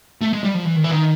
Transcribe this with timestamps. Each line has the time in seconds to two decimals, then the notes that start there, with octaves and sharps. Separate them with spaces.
0.21 A3
0.33 G#3
0.43 G3
0.54 F3
0.65 E3
0.76 D#3
0.84 E3
0.92 D#3